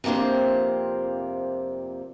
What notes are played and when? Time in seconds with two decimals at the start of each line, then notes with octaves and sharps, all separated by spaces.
0.04 F2 C3 A#3 D4 C5